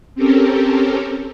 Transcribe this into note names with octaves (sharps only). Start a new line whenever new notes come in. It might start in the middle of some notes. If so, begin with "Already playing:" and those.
C4 C#4 G4 A4 A#4